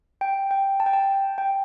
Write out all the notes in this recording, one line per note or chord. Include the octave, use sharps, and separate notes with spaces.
G5
G5
A5
G5
A5
G5